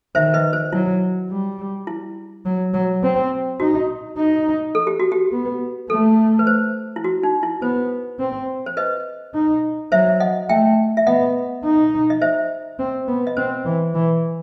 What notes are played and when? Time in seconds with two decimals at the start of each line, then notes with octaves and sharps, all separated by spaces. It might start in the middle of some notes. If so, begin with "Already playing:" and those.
0.15 D#3 C5 E5
0.34 B4 D#5
0.53 C5
0.73 F#3 E4
1.30 G3
1.87 E4
2.45 F#3
2.74 F#3
3.03 C4
3.60 D#4 F#4
4.17 D#4
4.75 A4
4.87 G4
5.00 F#4
5.12 G4
5.32 B3
5.89 A3 A4
6.39 B4
6.47 C5
6.96 E4
7.04 F#4
7.23 D#4
7.43 E4
7.62 B3 C5
8.20 C4
8.66 C5
8.77 B4 D#5
9.34 D#4
9.92 F#3 C5 E5
10.20 D#5 F#5
10.49 A3 E5 G5
10.97 E5
11.07 B3 D#5 F#5
11.64 D#4
12.10 D#5
12.22 C5 E5
12.79 C4
13.08 B3
13.27 D#5
13.37 C4 C5
13.65 E3
13.95 E3